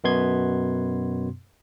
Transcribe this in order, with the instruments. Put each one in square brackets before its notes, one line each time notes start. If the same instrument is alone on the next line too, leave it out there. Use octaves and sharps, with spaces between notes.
[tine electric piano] F#2 B2 B3 C6 G#6